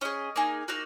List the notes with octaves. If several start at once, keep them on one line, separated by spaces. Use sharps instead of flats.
C#4 G#4 D#5
A#3 D#4 G#4
A#3 D#4 F#4